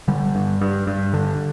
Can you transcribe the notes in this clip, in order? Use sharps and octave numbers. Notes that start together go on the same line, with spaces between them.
D3 G3
G2
G2
G2
D3